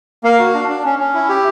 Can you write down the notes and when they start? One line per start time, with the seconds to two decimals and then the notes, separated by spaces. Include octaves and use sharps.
0.24 A#3 F5
0.39 F#4
0.54 D4
0.69 D4
0.85 C#4
0.99 C#4
1.14 E4
1.29 G4